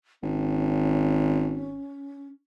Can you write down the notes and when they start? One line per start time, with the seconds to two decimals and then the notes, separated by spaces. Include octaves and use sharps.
0.23 G#1 C#4